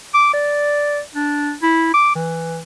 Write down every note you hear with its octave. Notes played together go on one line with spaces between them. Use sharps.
D6
D5
D4
E4
D6
E3